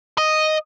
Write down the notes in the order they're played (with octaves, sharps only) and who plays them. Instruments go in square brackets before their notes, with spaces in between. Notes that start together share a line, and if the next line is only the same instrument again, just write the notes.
[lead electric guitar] D#5